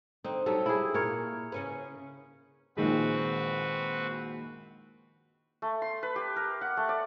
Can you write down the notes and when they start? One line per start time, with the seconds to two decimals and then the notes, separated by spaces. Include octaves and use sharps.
0.24 D3 C4 D#4
0.46 F#3 G3 D#4 A4
0.66 E4 G#4
0.94 A#2 A#4 C#5
1.52 C#3 C#4 B4
2.77 A#1 D#3 G#3 C4 F#4 B4
5.62 A3
5.82 C6
6.03 B4
6.16 G4
6.36 A#4
6.61 F#5
6.77 A3
6.89 D5